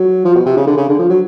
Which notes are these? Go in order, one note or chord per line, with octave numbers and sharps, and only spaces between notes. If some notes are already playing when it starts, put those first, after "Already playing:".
Already playing: F#3
F3
B2
C3
C#3
D3
C#3
D3
F3
F#3